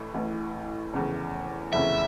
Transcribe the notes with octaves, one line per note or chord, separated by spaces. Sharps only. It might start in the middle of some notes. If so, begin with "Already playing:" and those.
Already playing: A1 A2 E3
A1 A2 E3
F1 E2 C#3
F1 E2 C#3 E5